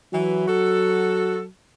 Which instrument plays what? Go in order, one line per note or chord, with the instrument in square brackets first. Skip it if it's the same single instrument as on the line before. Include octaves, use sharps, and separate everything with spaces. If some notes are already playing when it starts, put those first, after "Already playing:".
[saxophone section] E3 [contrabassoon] F#3
[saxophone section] F#4 A4